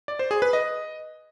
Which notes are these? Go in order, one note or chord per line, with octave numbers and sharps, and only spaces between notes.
D5
C5
G#4
B4
D#5